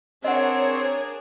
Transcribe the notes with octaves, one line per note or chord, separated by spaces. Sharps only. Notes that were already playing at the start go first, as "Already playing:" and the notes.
C4 D4 G#4 A#4 C#5 D#5 F#5